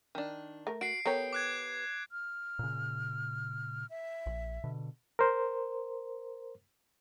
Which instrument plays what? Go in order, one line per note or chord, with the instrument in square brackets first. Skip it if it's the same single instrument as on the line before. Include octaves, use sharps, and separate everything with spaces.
[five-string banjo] D#3 D4
[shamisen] A3 A#4
[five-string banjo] F#4 [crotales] C7 D7
[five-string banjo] B3 G4 [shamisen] A4 A#4 C#5
[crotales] D6 F#6 G#6
[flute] F6
[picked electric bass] A#2 C#3
[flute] E5
[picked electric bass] A#1
B2 D3
[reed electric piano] A#4 C5